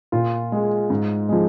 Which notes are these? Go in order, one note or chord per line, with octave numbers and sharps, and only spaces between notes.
A#2 F4
G#3
G#2
F3 G#3